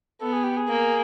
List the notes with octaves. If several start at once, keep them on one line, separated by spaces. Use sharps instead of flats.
B3 A4
G#4
G4
G#4
A#3